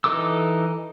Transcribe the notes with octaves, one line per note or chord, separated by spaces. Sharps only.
E3 D#4 A4 D6 E6